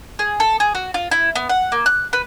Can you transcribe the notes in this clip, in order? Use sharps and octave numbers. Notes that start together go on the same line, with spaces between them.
G#4
A4
G#4
F#4
F4
E4
B3
F#5
A#3
F#6
B4